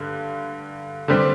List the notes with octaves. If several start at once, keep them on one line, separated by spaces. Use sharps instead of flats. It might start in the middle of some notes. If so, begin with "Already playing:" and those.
Already playing: G2 D3
D3 G3 C4 G4